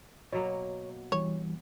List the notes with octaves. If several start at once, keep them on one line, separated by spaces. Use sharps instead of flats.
B2 F#3 A#3 C#5
E3 G3 C#5